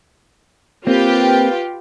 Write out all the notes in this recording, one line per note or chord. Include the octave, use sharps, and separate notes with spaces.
A#3 C4 F4 G4 B4